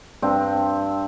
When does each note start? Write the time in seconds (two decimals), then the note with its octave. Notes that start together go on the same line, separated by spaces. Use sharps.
0.22 G2 C4